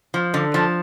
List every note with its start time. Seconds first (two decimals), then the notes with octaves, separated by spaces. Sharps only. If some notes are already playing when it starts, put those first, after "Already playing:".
0.14 F3
0.34 D3
0.54 F3